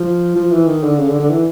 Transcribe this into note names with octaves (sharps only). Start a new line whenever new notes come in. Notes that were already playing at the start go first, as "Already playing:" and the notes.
Already playing: F3
F3
E3
D#3
D3
C#3
D3
D3
E3